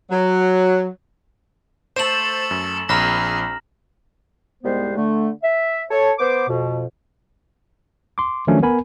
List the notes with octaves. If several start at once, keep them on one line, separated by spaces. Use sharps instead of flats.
F#3
A3 A4 C5 E7 F#7
F#2
A#1 C4 G#4 A#5 B5 F6 A#6
C2 G#2 G3 G#3 B3 C5
D3 A3
E5
A4 C#5
B3 C5 D6
F2 B2
C6 D6
D#3 F3 F#3 A3 C#4 D4
B3 A#4 G#5 B5